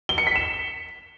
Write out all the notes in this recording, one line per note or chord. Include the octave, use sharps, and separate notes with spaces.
G7
C#7
B6
E7